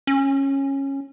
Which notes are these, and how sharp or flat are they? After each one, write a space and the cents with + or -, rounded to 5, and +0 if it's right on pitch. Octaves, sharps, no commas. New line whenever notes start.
C#4 -15